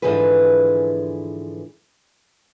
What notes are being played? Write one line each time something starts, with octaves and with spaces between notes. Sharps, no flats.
G#2 D3 E3 F3 G#4 B4